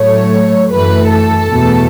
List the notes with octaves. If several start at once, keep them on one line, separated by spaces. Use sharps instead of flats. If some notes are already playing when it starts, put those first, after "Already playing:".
Already playing: A2 F#3 A3 C#5
F#2 E3 A3 B4
A4
E2 B2 A3